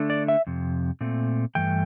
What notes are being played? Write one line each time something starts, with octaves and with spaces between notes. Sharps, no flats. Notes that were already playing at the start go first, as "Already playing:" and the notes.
Already playing: D3 A3 D4
D5
E5
F2 C3
A#2 A3 C4
G2 E3 A3 G5